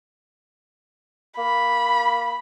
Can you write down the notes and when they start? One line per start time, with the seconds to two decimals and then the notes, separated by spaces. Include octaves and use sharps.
1.38 A#3 B5